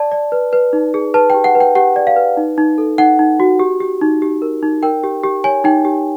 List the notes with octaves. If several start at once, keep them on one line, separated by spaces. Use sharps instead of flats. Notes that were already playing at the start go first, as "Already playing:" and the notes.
Already playing: D5 A5
D5
B4
B4
D#4
G#4
B4 A5
G5
G4
F#5
B4
G5
G4 F#5
D5
F5
B4
D#4
D#4
A4
D#4 F#5
D#4
F#4
G4
G4
D#4
G4
A#4
D#4
A#4 G5
G4
G4
C#5 G#5
D#4 G5
G4